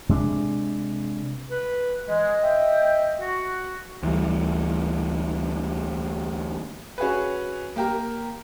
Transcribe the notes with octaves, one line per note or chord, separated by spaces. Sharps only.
C3 G#3 C#4 D4
B4
E3 G#3 D#5
E5 G5
F#4
D2 E3 G3
C#4 F#4 G#4 B4
A#3 G4 A#4